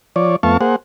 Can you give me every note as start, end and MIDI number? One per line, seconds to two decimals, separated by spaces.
0.16 0.36 53
0.16 0.36 73
0.16 0.36 74
0.43 0.57 41
0.43 0.57 57
0.43 0.57 59
0.43 0.57 77
0.43 0.57 81
0.43 0.57 85
0.61 0.76 58
0.61 0.76 68
0.61 0.76 72
0.61 0.76 78